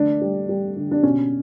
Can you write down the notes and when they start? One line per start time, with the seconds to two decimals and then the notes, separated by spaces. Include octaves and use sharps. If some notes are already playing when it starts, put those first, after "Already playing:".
Already playing: D3 A3 D4
0.21 G3
0.49 G3
0.76 D3
0.91 D4
1.03 B2 C#4